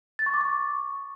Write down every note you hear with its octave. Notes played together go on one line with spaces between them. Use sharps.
A6
C#6
D6
C#6